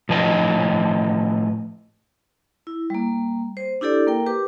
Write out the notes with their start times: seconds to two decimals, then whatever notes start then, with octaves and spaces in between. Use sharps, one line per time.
0.09 A2 F3 B4 D#5
2.67 E4
2.90 G3 A#3
3.57 C5
3.81 D4 E4 G4 A4 D5
4.07 A#3 A#4 G5
4.26 G4 B4 D6